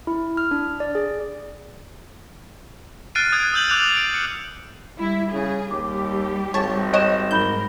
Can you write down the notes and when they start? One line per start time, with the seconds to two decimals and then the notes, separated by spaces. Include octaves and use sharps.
0.07 E4
0.37 F6
0.51 D4
0.80 D5
0.95 G#4
3.15 F6 F#6 A6 C7 D7 D#7
3.32 D#6 F#6 G#6 D7
3.52 D#6 E6 G6 F#7
3.70 D6 F#6 G6 F7
3.97 D7
4.14 C#7
4.99 G3 E4
5.32 C#3 G#4
5.71 D#2 G3 G4 D6
6.54 G#1 C#5 A5
6.93 C#5 D#5 G5 F#6 E7
7.31 G#2 F#3 D#4 A#4 B5 G6 G7